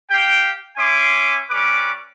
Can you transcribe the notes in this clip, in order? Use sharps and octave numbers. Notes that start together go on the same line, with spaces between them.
G4 F5 G5
C#4 E5 G#5 C6 D6
G3 C#4 B4 D6